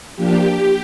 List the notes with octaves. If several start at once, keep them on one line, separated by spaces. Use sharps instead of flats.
F3 A#3 D4 G4